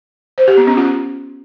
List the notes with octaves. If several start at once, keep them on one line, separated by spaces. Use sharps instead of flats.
C5
G4
B3
C#4
F4